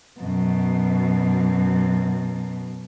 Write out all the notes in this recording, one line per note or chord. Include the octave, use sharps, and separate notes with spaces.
F#2 B2